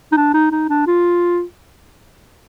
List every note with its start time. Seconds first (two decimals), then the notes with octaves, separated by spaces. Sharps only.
0.12 D#4
0.17 D4
0.34 D#4
0.52 D#4
0.70 D4
0.87 F4